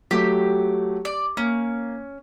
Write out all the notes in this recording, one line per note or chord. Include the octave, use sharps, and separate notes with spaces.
F#3 A3 G4
D5
A#3 C#4